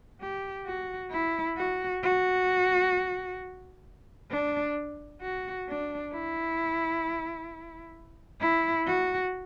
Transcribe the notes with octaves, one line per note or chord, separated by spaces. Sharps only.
G4
F#4
E4
F#4
F#4
D4
F#4
D4
E4
E4
F#4